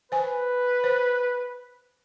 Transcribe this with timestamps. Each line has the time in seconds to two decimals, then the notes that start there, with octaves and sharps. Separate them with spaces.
0.12 B4 C5 G#5
0.84 C5